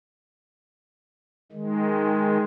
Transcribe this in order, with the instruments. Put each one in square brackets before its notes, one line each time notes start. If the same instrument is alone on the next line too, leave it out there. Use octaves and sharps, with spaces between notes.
[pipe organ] D#3 G#3